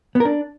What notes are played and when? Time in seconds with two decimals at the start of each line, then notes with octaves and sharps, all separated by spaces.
0.15 B3
0.20 A#4
0.25 D4